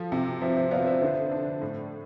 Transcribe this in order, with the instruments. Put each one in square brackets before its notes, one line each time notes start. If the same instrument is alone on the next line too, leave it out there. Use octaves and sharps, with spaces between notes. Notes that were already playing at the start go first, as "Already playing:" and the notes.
Already playing: [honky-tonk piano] F3 [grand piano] F4 A4
[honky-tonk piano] C3
[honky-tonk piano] F3 [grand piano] C5 E5
[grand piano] C5 E5
[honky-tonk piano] B3 [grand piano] D5 F5
[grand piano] C5 E5
[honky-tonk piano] D3 [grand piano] C5 E5
[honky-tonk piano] D4
A2